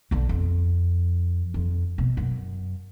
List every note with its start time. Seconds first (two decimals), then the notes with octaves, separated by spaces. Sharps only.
0.11 B1 D3
0.29 F2
1.54 F2
1.98 B2
2.17 F#2